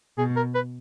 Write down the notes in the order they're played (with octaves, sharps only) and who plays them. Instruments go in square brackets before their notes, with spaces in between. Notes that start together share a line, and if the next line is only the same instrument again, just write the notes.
[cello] B2 [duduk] G#4
[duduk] A#4
B4